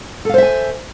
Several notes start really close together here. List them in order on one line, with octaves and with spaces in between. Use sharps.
A4 F5 C5 E5 G#5